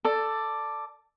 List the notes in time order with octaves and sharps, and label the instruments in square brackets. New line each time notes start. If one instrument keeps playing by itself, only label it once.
[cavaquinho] A4 D5